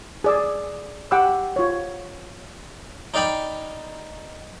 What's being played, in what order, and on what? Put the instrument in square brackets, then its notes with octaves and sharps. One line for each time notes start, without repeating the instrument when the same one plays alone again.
[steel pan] G#4 D5 E6
G4 F#5 G5 B5 D6 E6
F4 C#5
[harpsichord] D#4 D5 F5 G5 B5